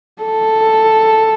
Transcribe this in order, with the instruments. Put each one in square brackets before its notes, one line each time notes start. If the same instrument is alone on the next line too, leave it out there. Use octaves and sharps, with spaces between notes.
[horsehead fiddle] A4